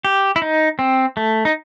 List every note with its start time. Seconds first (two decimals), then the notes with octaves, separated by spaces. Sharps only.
0.05 G4
0.36 E4
0.42 D#4
0.79 C4
1.17 A3
1.45 D#4